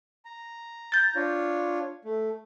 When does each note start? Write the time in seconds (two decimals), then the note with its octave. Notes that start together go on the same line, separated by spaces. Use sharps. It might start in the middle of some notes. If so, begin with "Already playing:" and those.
0.25 A#5
0.92 G6 A6
1.16 D4 F4 C#5
2.05 A3